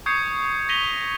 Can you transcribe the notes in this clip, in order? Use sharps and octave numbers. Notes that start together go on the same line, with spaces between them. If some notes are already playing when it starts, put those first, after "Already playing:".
C#6 D#6 G6 G#6 C7 C#7
A#6 B6 D#7 F7 G7